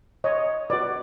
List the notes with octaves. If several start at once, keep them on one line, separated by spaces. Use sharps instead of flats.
C#5 D#5
F#4 B4 D5